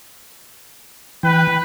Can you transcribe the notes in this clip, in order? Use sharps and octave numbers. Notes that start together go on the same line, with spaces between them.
E3 B4 G5